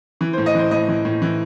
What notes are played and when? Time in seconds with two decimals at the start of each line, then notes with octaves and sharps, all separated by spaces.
0.21 E3
0.33 A2 C5
0.46 D#5
0.55 E3 C5
0.71 A2 D#5
0.88 E3
1.05 A2
1.22 E3